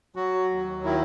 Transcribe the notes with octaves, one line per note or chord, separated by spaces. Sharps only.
F#3 F#4
D#2
D#3 E4